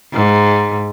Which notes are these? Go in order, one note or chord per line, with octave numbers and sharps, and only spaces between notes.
G#2